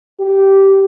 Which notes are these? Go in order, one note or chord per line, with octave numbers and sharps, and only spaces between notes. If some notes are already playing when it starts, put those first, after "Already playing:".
G4